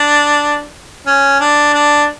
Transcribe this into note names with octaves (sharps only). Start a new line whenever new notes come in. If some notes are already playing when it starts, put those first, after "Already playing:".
Already playing: D4
C#4
D4
D4